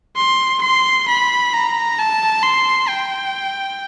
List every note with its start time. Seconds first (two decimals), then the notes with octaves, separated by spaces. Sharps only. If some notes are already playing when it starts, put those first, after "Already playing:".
0.16 C6
0.61 C6
1.08 B5
1.53 A#5
1.99 A5
2.43 C6
2.89 G5